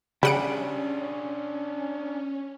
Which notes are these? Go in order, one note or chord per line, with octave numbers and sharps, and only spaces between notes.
C#3 G3 C#4 D4 G#4 F#5 D7